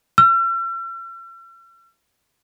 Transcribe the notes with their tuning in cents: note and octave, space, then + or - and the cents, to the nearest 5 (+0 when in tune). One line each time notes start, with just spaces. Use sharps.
E6 +45